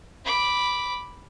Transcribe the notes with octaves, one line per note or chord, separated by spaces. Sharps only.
B5 D6